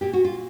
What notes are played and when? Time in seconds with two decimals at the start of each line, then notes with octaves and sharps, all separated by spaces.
0.01 A#2 G4
0.13 F#4
0.24 F4